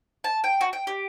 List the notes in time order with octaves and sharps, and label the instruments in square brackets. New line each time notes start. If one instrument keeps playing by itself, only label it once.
[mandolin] A5
G5
F#4
G5
G4